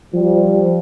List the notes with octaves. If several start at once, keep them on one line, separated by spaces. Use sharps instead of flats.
F3 G3